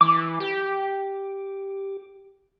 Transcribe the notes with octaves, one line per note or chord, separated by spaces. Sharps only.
E3 D6
G4